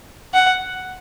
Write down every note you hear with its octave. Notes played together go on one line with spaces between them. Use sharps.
F#5